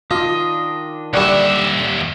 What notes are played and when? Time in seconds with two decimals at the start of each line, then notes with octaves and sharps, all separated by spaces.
0.11 D#3 D4 F4 D#5
1.14 D#2 D3 G3 E5 F#5 C#6